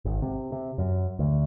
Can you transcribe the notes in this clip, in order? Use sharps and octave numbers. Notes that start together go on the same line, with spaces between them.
G#1
C3
C3
F#2
D2